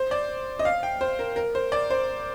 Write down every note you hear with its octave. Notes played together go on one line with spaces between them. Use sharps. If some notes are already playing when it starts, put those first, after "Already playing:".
Already playing: C5
D5
D#5
F5
G5
C5
A#4
A#4
C5
D5
C5